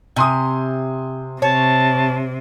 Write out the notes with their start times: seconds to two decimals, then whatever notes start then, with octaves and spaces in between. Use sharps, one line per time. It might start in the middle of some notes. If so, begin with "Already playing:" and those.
0.16 C3 G#5 C6 D#6
1.42 C3 C#5 A5